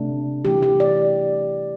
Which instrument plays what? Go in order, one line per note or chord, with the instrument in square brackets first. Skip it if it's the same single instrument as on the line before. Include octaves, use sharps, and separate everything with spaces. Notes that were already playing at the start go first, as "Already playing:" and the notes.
Already playing: [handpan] C3 A3 D4
E3 A3 E4 G4
G4
D5